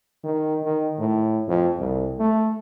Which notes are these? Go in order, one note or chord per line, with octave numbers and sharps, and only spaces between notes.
D#3
D#3
A2
F2
C2
A3